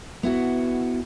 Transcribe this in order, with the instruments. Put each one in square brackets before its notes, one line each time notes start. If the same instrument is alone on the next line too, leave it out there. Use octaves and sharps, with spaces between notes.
[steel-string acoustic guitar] B3 E4 F#4